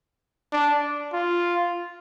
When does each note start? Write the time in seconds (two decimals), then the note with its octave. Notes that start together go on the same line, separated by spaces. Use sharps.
0.53 D4
1.14 F4